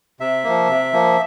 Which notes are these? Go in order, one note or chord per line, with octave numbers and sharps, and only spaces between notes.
C3 E5
F3 A#3
C3
F3 A#3